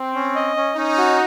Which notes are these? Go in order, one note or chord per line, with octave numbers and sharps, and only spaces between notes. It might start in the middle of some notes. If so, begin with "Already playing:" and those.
Already playing: C4
C#4
D#5
C#4
C#4 D#4
F#4